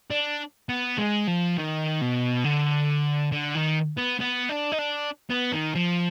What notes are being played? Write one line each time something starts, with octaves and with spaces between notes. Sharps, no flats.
D4
B3
G#3
F3
D#3
B2
D3
D3
D#3
B3
B3
D4
D#4
D4
B3
D#3
F3